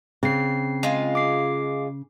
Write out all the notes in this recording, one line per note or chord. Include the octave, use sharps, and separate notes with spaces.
C#3 C4 C7
G#3 F4
D6 C7